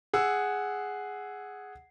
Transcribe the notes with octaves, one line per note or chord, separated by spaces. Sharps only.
G#4 F#5 E6